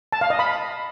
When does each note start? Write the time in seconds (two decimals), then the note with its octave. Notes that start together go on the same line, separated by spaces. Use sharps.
0.12 A5
0.21 F5
0.30 D#5
0.39 B5